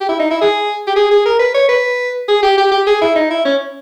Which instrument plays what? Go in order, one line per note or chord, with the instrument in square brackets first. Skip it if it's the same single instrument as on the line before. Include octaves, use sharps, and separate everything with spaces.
[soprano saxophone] G4
E4
D#4
E4
G#4
G4
G#4
G#4
A#4
B4
C#5
B4
G#4
G4
G4
G4
G#4
E4
D#4
E4
C#4